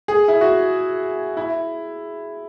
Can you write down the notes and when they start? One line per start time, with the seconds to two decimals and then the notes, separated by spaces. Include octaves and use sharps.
0.08 G#4
0.28 E4
0.41 F#4
1.37 E4